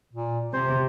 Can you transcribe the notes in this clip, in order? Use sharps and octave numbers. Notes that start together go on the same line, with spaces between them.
A#2
C3 C5